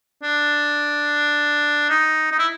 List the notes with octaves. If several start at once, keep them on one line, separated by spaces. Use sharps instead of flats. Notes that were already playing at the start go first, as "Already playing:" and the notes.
D4
D#4
D#4
E4